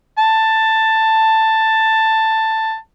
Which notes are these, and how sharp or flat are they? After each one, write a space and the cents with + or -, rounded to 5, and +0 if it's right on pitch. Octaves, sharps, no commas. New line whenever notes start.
A5 +10